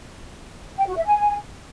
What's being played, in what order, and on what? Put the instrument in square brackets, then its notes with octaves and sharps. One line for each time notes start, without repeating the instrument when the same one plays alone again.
[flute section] G5
F#4
E5
G#5